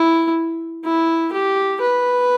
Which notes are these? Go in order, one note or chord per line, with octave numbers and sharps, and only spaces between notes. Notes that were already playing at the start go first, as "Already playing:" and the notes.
Already playing: E4
E4
G4
B4